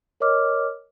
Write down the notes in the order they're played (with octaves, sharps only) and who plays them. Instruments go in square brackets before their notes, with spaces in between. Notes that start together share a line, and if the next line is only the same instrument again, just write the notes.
[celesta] A#4 C#5 D#5 D6 F6